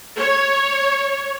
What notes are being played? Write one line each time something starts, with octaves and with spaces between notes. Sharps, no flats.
C#5